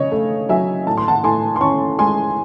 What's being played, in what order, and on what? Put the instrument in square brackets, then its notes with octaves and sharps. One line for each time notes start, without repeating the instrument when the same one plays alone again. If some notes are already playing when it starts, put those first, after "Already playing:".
Already playing: [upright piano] C#3 C#5 D#5
A3
F#3 E5 G#5
A2 A5
C6
F#5 A5
A2 G#5 C6
C6
C#4 A5 C#6
G#3 G#5 C6